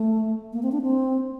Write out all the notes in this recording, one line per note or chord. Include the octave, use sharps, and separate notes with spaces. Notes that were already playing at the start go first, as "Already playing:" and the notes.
Already playing: A3
A#3
C4
D4
C4